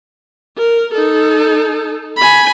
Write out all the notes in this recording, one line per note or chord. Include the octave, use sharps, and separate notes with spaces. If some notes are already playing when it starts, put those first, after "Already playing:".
A#4
D#4 A4
G#5 B5